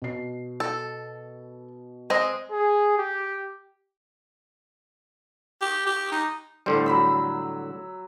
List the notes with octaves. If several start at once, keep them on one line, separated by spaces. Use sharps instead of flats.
B2 C7
A4
G#3 C4 D#5
G#4
G4
G4
G4
D#4
A2 D3 G3 C5
F#3 B5 E6